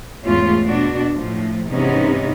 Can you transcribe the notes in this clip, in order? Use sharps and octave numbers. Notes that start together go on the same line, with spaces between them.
E2 G#2 A3 C#4 F4
B2 D4 F#4
A2 F3
G#2 C3 E3 B3 C#4 D#4